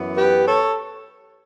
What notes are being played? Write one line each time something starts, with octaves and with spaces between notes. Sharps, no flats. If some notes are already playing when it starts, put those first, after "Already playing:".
Already playing: F#2 E3 B3
G4 B4
A4 C#5